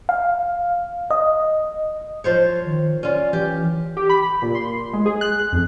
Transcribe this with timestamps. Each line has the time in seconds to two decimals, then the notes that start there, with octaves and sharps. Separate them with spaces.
0.09 F5
1.11 D#5
2.24 F3 C5 C#5
2.65 D#3
3.03 C#4 F4 D5
3.33 E3 G4
3.97 G4
4.09 B5
4.42 A#2
4.55 C6
4.93 G#3
5.06 G#4
5.21 F#6
5.52 F2